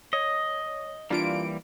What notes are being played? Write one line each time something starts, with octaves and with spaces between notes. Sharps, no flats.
C#5 D#5
E3 G3 A#3 D4 F4 D7